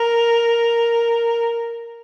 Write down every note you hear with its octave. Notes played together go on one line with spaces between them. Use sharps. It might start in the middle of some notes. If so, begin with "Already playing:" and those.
Already playing: A#4